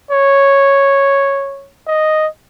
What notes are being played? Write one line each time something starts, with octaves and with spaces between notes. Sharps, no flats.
C#5
D#5